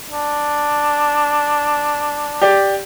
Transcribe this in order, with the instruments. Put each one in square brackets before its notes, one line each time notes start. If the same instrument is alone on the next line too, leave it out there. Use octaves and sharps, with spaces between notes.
[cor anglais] D4
[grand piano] G4 D5